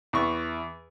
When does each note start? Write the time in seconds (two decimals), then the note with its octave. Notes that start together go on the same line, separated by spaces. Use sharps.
0.13 E2 C#6